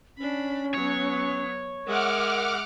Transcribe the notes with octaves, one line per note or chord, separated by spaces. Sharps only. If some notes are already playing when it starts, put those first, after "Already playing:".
C#4 D4 B5
F#3 B3 C#5
G#3 A#4 E5 F#5 D6 F6